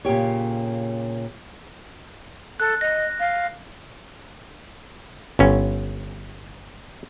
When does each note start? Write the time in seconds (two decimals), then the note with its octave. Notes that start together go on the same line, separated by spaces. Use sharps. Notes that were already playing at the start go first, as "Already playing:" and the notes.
0.05 A#2 C#3 G4 C#5
2.60 A4 F#6
2.81 D#5 A#6
3.20 F5
5.39 G1 C#4